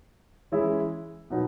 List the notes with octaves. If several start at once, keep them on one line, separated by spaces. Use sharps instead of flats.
E3 G#3 C#4 E4 G#4
B2 F#3 B3 D#4